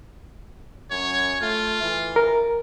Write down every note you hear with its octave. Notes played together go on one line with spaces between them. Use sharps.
F#2 C#5
A3 F4
E3
A#4